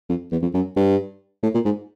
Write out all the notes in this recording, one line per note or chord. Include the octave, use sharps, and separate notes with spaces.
F2
E2
F2
F#2
G2
A2
A#2
G#2